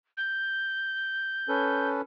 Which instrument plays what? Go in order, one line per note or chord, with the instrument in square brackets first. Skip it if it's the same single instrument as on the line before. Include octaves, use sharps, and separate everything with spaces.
[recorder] G6
[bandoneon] C#4 A4 B4